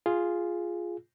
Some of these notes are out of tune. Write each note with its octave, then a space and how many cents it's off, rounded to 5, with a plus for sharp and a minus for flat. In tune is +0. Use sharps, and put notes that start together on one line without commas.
F4 +0 G#4 +0